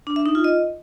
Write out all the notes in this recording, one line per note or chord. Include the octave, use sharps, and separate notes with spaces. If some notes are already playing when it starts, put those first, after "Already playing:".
D4
E5
D#4
F4
D#5